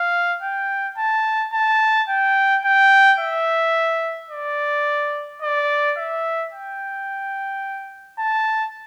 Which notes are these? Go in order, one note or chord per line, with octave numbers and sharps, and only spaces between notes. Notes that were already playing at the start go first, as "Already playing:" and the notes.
Already playing: F5
G5
A5
A5
G5
G5
E5
D5
D5
E5
G5
A5